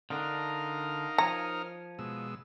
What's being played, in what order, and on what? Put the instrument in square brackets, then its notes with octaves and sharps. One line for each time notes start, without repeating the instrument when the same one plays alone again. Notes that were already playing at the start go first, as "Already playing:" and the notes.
[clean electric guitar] D3 D4 [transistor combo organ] D#4 A#4 F5
[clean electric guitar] F3 C#5 [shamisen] A#5
[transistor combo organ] B2 G#3 E6